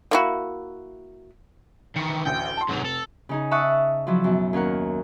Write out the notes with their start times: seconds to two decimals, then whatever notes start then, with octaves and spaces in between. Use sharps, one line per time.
0.11 A#3 E4 F#4
1.96 D#3 E3 C#7
2.26 A1 D2 G5
2.57 A5 C6
2.69 F1 G#2 F#3 F7
2.85 A4
3.29 C#3 D#4 G#4
3.51 E5 F#5 A5 C#6 D#6 F#6
4.07 F3 F#3 E4
4.24 F#2 B2
4.53 D#2 C#4 A#4 F#5